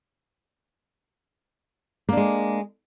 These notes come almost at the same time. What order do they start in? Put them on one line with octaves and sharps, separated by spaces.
A#3 D4 G#3